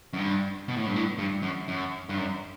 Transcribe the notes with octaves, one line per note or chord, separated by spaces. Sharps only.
F#2
G2
B2
A2
G2
A2
G2
F#2
F#2
G2
F#2